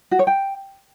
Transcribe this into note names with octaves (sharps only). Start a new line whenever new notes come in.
F#4
C#5
G5